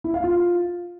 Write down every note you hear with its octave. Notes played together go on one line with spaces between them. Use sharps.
E4
F5
F4